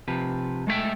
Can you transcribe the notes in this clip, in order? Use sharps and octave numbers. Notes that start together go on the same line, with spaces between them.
C3 F3 B4
G#3 A3 B3 E5 G5